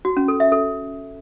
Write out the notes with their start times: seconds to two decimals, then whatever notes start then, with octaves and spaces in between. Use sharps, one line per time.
0.05 F#4
0.17 C#4
0.28 A4
0.40 E5
0.52 A4